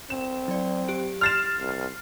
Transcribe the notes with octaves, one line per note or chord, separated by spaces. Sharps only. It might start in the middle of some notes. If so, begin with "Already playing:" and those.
C4 E7
F#3 D5
G4 D7
C6 F6 A6 C7 E7
C2